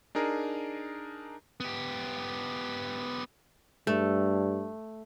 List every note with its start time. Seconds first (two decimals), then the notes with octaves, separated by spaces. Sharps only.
0.15 D4 D#4 G#4 A#4
1.60 B3 G4
3.87 G2 A3